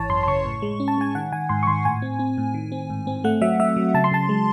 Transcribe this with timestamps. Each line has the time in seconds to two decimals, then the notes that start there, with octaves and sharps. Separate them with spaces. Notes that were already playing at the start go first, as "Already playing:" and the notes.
Already playing: G#1 E3 C#5 A5
0.10 F#2 C6
0.23 C6
0.27 C#3 C#6
0.45 A2
0.62 G#3
0.80 C#4
0.88 A5
0.98 G#3 G#5
1.15 D#3 F#5
1.32 D#3 G#5
1.49 G#2 C6
1.63 C#6
1.67 D#3 C6
1.85 A2 G#5
2.02 C4
2.19 C4
2.38 A2
2.54 D#3
2.72 C4
2.90 G#2
3.07 C4
3.24 A3 F#5
3.41 F#3 E5
3.60 F#3 E5
3.76 F#3
3.94 C#3 A5
4.04 C6
4.12 C#3 A5
4.29 G#3